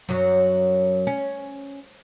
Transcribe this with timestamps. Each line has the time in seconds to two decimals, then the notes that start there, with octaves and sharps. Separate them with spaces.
0.09 F#2 F#3
1.07 C#4